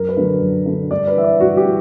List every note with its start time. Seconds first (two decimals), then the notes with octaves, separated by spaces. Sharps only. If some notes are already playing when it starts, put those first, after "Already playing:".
Already playing: F#2 A#4
0.09 B4
0.17 D3 F#3
0.41 F#2
0.66 D3 F#3
0.91 G2 D5
1.07 B4
1.16 E3 E5
1.24 D5
1.40 G2 F#4
1.57 G4
1.65 E3